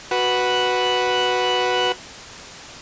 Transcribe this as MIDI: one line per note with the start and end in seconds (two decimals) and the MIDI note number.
0.11 1.92 66
0.11 1.92 71